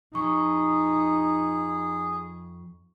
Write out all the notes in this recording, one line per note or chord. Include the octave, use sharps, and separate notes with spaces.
F2 D#4 G#4 C#6